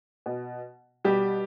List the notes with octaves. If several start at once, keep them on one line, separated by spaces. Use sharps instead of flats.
B2
B2 G3 G4